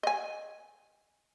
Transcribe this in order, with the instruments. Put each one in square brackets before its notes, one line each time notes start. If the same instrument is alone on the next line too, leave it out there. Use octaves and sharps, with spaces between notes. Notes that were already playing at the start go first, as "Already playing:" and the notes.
[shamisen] D#5 G#5